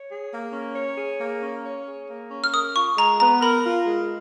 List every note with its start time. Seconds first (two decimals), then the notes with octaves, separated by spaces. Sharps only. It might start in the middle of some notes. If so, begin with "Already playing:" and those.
Already playing: C#5
0.09 G#4
0.32 A#3
0.53 C#4
0.76 C#5
0.97 G#4
1.20 A#3
1.42 C#4
1.64 C#5
1.87 G#4
2.08 A#3
2.31 C#4
2.44 F6
2.53 A#4 D#6
2.76 F4 C#6
2.97 G#3 A#5
3.20 B3 A#5
3.42 A#4 B5
3.64 F4
3.87 G#3